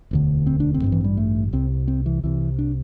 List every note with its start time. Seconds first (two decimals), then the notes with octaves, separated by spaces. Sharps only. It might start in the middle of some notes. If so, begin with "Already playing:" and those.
0.11 E1 D2 D3
0.46 C4
0.60 D4
0.74 C4
0.82 A1 G2 D3
0.92 E3
1.04 G3
1.17 A3
1.53 C2 C3 C4
1.88 C4
2.06 E3
2.23 C2 C3 E3
2.59 D4